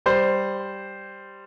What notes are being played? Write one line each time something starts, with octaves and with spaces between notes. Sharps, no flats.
G3 C5